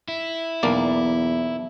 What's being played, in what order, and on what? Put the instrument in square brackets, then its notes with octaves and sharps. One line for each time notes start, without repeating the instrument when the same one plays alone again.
[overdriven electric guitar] E4
[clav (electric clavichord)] B1 A#3 D5 [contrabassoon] E2